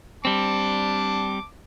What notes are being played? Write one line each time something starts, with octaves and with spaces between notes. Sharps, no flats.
G3 C4 A5 D6